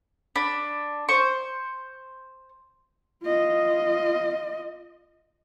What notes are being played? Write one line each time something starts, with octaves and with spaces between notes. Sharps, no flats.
D4 B5
C5 C#6
F4 D#5